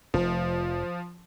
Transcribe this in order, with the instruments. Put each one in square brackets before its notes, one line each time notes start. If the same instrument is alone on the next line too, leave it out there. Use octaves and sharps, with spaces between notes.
[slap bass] F1 [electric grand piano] F3